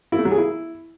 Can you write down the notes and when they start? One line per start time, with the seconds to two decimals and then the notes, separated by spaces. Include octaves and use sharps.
0.12 E4
0.19 A3
0.25 F#3
0.31 G#4
0.38 E4